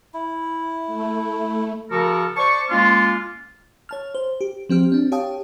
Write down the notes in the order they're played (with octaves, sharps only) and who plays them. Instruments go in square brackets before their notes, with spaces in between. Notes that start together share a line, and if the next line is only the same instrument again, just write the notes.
[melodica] E4
[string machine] A3
[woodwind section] C#3 F3 F#4 A4 A#4
C5 D5 A5 C#6
G#3 A#3 C#4 F4
[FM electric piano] C#5 A5 F6
C5
G4
F3 C4 G4 F6
C4 D4
G4 C#5 F5 G5 A5 D#6